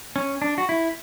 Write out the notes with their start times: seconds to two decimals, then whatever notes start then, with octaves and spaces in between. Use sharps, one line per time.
0.16 C#4
0.42 D4
0.58 F#4
0.69 E4